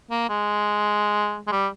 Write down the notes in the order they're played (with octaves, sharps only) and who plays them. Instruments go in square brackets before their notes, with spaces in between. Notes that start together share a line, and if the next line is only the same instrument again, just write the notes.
[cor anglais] A#3
G#3
G#3
G3